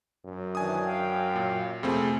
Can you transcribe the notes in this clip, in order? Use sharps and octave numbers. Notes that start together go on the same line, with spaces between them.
F#2
D#3 E3 D4 G#5 D#6
F5 G5
A#2
F2 C3 A3 C4 G#4